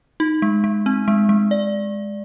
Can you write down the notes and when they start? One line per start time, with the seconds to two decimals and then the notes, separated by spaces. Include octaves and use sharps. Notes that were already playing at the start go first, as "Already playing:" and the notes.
0.20 D#4
0.42 G#3
0.64 G#3
0.86 C4
1.08 G#3
1.29 G#3
1.51 D5